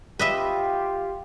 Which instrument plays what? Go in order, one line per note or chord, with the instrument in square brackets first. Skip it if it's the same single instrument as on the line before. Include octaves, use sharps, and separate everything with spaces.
[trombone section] F4 G4 [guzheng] B4 D#5 E5